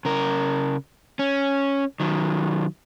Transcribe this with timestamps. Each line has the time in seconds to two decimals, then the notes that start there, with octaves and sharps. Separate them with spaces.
0.05 C#3 A#4
1.19 C#4
2.00 D#3 F#3